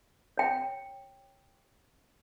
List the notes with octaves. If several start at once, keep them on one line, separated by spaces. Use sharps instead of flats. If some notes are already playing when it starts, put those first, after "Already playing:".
C#5 G5